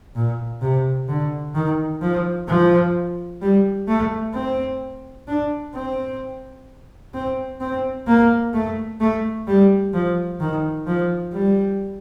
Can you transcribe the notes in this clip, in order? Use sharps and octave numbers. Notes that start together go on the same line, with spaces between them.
A#2
C3
D3
D#3
F3
F3
G3
A3
C4
D4
C4
C4
C4
A#3
A3
A3
G3
F3
D#3
F3
G3